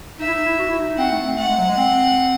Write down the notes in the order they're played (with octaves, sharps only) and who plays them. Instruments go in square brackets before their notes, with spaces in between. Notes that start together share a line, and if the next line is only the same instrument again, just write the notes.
[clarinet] D#4 [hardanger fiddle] E5
[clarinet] E4
D#4
E4
F#4
E4
D#4
D#4
[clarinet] C4 [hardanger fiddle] F#5
[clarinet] A3
C4
[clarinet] A3 [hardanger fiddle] F#5
[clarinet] G#3
F#3
G#3
C4